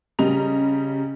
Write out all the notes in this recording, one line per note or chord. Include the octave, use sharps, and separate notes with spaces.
C#3 G3 D#5 A#5 F7